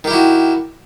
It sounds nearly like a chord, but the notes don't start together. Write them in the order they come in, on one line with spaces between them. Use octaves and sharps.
D#3 G4 E4 F#4